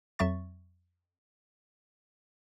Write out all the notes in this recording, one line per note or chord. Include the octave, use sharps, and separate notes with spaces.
F2 F#3 E5 C#6 A6